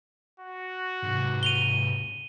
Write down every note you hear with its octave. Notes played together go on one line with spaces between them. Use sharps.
F#4
G#2 C3
D#7 F7 G7